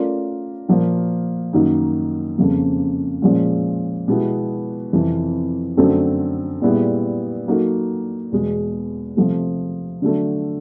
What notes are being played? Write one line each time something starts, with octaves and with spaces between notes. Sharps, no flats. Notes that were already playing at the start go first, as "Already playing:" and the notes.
Already playing: A3 C#4 F4 A#4 D5
A#2 F3 A#3
F#2 D#3 F#3 A#3 D#4
F2 C#3 F3 A#3
A#2 F3 G#3 C#4
B2 G#3 B3 E4 G4
F2 C3 E3
F#2 D3 F#3 A3 C4
A#2 G3 B3 E4 G#4
F#3 A#3 D#4 F#4 A4
E2 B2 G#3
C3 F3 A3
D3 F#3 A3